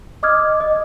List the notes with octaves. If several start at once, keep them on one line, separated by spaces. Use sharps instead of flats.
D#5 D6 D#6 F6 G#6
D#5